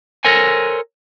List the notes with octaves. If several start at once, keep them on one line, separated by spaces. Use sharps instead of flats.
A4 A#4 C5 C#5 G#5